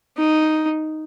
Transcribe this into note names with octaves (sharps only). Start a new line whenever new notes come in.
D#4